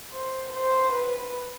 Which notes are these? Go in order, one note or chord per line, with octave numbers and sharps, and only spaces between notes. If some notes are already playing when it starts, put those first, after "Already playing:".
C5
C5
B4